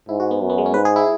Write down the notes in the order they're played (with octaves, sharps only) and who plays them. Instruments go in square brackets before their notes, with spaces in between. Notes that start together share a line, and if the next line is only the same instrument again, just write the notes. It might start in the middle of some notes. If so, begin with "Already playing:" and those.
[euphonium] G#2 [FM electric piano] E4
[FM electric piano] F#4
B3
[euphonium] F#2
[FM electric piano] B3
G#3
C#4
[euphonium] G#2 [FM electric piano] B4
[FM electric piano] G#4
E4